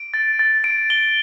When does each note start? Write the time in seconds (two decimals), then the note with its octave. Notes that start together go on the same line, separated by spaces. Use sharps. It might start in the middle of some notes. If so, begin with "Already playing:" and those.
Already playing: D7
0.14 A6
0.39 A6
0.64 D7
0.90 G7